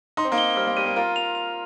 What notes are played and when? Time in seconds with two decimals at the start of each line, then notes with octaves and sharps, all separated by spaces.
0.17 D#4 C6
0.25 C4
0.32 A#3 D#4
0.38 G7
0.56 G3 C4 F6
0.67 A#3
0.77 G3 D#7
0.86 A#3
0.96 F4 A#4 F6
1.16 F7
1.35 F7